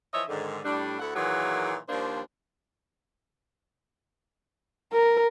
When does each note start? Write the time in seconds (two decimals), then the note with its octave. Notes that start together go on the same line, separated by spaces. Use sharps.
0.13 E3 F3 C#5 D#5 E5
0.28 G#2 D3 D#3
0.64 A2 G3 D4
1.00 D2 E4 A4 F#5
1.15 A#2 D#3 E3 F#3 G#4 B4
1.88 D#2 F3 G3 A#3 D4 C5
4.92 A#4